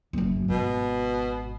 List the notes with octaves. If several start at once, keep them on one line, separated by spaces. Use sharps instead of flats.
F#1 F#2
G#1 B2